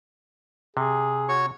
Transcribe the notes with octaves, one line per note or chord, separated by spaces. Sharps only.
C3 G#4
F#4 C#5 C#6